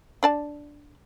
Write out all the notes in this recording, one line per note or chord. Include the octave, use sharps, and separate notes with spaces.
D4 D5 A5